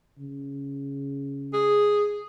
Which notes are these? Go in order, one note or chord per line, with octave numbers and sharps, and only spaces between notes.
C#3
G#4